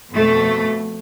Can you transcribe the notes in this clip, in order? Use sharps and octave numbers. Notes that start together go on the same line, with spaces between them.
F2 B2 A3